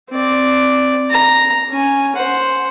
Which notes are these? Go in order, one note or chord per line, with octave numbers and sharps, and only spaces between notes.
C4 D5
A#5
C#4 G#5
C5 F#5